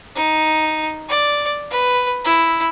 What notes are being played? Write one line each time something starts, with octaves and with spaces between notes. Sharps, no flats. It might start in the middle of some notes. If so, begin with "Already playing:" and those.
D#4
D5
B4
E4